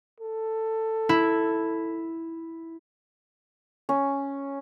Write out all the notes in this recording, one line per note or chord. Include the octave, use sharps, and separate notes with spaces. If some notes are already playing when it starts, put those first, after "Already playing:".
A4
E4
C#4